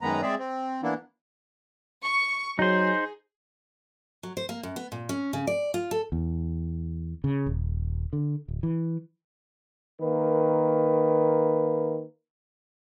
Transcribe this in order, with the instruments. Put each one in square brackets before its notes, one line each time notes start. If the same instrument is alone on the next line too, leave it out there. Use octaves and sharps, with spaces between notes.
[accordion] F#2 D#3 G#3 B3 B4 A#5
G#3 C4 G#4 D5 E5
C4
E3 A#3 B3 D4 E4
[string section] C#6
[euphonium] F#3 [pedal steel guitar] D#4 C5 [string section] G#4
[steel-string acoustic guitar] F#3
C5
A#3
F#2
B3
A#2
C#4
C#3
D5
F4
A4
[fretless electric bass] E2
C#3
D#1
D3
D1
E3
[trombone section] D#3 A#3 B4